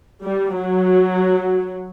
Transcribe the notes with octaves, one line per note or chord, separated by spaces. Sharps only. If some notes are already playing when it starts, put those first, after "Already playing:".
G3
F#3